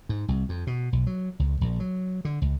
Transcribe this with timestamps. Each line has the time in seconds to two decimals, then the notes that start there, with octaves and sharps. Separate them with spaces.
0.09 G#2
0.28 C2
0.49 F2
0.67 B2
0.93 B1
1.07 F#3
1.39 C#2
1.61 A#1
1.80 F#3
2.25 D3
2.42 C#2